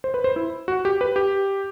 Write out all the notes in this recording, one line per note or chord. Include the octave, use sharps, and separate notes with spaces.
C5
B4
C5
E4
F#4
G4
B4
G4